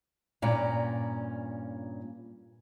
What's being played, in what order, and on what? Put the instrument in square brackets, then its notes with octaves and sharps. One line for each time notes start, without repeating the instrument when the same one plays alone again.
[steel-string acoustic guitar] G2 A#2 C#4 A#5